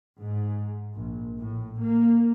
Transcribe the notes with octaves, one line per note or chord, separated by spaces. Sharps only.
G#2
A#1
A2
A#3